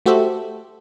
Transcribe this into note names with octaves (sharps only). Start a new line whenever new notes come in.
A3 F#4 G4 A4 C5 E5